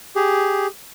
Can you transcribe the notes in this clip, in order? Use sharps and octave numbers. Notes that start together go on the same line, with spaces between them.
G4 G#4